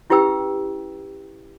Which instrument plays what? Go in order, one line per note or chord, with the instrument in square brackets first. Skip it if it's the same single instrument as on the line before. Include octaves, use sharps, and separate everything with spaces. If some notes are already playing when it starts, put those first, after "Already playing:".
[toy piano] C#4 E4 G4 B4 G5 E6